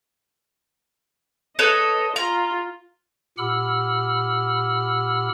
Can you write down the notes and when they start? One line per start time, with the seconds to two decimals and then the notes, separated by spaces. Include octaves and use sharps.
1.59 A4 B4 C#5 D#5
2.16 F4 A#5
3.38 A#2 G4 F#5 B5 E6 F6